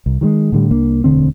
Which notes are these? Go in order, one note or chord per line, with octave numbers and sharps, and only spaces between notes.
C2
D#3 F3 G#3
A2 D3 G3
C2 A#3 D4
E1 D2 D3 C4